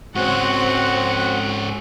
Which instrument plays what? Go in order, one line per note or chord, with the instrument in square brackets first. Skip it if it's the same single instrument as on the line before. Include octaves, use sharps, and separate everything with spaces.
[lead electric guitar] G#2 C#4 [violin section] C4 F#5 [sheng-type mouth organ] F#4